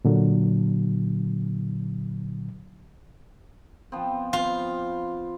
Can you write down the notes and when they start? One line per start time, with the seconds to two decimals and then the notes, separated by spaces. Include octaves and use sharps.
0.05 A#2 D3 F#3
3.92 F3 B3 C4
4.33 F4